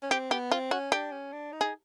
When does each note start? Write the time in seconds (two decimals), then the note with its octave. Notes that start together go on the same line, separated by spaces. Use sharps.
0.03 C#4
0.11 C4 G4
0.31 B3 G4
0.51 C4 F4
0.71 C#4 F#4
0.92 D4 G4
1.12 C#4
1.33 D4
1.52 D#4
1.61 G#4